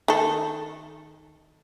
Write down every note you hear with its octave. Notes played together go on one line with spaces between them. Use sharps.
D#3 A4